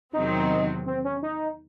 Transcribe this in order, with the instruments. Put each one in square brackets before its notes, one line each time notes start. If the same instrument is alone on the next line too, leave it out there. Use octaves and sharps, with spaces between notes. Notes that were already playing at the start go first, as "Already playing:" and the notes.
[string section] E2 C3 D#3 F#3 C4 [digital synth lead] D#4
[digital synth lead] C4
C#4
D#4